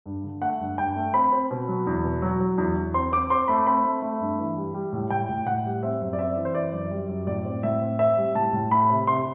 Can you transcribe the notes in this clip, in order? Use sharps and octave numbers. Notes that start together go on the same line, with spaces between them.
G2
D3
A3 F#5
G2
G2 G5
A3
C4 B5
C4
B2
F#3
E2
B2
F#3
F#3
E2
E2
C4 C6
C4 D6
C4 C6
A3 B5
C4 B5
A3
A3
G2
E3
G3
G3
A2
A2 G5
A2
A2 F#5
G3
C4 E5
F#2
D5
C4 E5
E3
C5
E3 D5
F#2
G3
F#2
A2 D5
C4
A2 E5
C4
C4 E5
G3
A2 A5
A2
A3 B5
C3
C3 C6